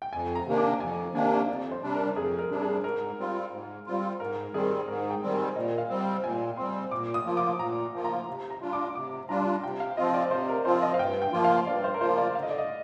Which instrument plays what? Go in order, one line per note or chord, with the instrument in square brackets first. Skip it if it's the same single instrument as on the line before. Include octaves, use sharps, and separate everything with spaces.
[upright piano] G5
[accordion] F2 [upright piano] G#5
[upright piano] A#5
[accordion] C3 D#3 A#3 D4
[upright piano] D6
[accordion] F2 [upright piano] G#5
[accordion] C3 D#3 A#3 D4 [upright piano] G#5
[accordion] F2 [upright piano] D5
[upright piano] C5
[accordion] C3 G3 D4
[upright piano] A#4
[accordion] F2 [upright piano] G#4
[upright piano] A#4
[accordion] C3 G3 D4
[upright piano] G#4
[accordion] G#2 [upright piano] A#4
[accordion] G3 C4 F4
G#2
G3 C4 F4
[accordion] G#2 [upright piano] A#4
[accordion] D#3 G3 C4 [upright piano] G#4
[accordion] G#2 [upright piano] A#4
[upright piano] G5
[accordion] D#3 G3 C4
[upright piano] G#5
[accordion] A#2 [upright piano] D#5
[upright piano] F5
[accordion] G3 C4
[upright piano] G5
[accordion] A#2 [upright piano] G#5
[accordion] G3 C4 [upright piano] C6
[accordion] A#2 [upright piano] D6
[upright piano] D#6
[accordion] F3 A#3 F4
[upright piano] D6
[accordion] A#2 [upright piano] A#5
[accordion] F3 A#3 F4
[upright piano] A#5
[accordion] C3
[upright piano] A#5
[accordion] G3 D4 F4
[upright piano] D6
[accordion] C3 [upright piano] D6
[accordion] G3 D4 F4 [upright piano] A#5
[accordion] C3 [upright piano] G5
[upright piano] F5
[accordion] F3 C4 F4 [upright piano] D#5
[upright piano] D5
[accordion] C3 [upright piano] C5
[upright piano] A#4
[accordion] F3 C4 F4 [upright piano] C5
[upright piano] D#5
F5
[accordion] G2 [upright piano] G5
[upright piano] G5
[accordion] F3 A#3 F4
[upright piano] F5
[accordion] G2 [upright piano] D5
[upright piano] C5
A#4
[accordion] F3 A#3 F4 [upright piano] C5
[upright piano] D5
[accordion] D3 [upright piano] F5
[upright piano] D#5
D5
D#5